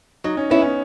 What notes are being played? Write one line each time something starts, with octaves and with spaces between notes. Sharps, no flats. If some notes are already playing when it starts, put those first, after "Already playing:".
F#3 D#4
C#4
B3 C#4 E4
C#4